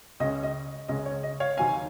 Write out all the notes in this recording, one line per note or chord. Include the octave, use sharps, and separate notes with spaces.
C#2 C#3 G#3 C#4 D#5
D#5
C#2 C#3 G#3 C#4 D#5
C#5
D#5
C#5 F5
D#2 D#3 F#3 C4 F5 G#5